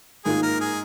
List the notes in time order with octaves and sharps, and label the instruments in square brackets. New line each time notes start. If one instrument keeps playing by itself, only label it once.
[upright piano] G#2 D#3 A#3 F4 [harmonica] G#4
[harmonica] A#4
G#4